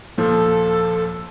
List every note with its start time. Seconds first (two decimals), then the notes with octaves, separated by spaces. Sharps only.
0.18 D#2 A#2 F3 A4